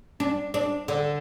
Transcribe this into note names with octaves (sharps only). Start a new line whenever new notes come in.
D4
D4
D3